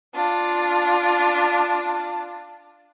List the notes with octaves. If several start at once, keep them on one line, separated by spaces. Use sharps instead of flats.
D4 F4